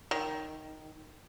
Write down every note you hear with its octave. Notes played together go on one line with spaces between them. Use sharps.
D#3